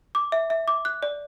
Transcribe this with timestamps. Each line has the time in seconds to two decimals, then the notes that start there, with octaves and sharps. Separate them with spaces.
0.15 D6
0.32 E5
0.50 E5
0.68 D6
0.85 F#6
1.03 D5